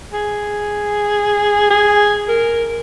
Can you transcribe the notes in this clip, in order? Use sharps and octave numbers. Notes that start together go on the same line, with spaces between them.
G#4
G#4
A#4